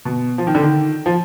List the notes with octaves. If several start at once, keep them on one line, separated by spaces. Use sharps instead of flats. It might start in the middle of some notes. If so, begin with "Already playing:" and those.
B2
F3
D#3
D3
D#3
F3